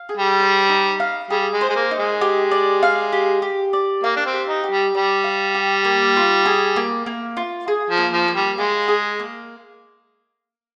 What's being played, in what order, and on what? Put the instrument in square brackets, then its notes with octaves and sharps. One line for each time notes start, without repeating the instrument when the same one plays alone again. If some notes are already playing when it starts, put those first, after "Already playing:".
Already playing: [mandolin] F5
G#4
[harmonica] G3
[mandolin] C5
D#4
F5
[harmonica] G3 [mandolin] G#4
[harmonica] G#3
[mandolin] C5
[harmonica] G#3
A#3
[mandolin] D#4
[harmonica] G#3
[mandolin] G4
D5
F5
G4
G4
D5
[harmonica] A#3 [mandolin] F5
[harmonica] D4
C4
[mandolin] G4
[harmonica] D#4
[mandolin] G4
[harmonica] G3
[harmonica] G3 [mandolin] D5
[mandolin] F5
G4
A#3
F4
G#4
A#3
A#3
F4
G#4
[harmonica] F3
[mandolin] A#3
[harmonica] F3
[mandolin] A#3
[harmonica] G3
[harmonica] G#3 [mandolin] F4
[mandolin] G#4
A#3